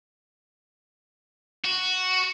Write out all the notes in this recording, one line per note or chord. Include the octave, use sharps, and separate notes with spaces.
F#4